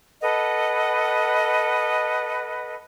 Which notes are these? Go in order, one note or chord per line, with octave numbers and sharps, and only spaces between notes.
A4 B4 D#5 F#5